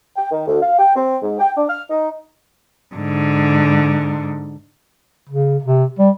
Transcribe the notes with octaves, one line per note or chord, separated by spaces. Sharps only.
G5
D#3
D2
F5
G5
C4
G#2
G5
D4
F6
D#4
G#2 D3
C#3
C3
G3